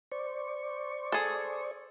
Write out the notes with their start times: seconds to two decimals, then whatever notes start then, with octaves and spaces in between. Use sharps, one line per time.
0.12 C5 D5 C#6
1.12 G#4 A4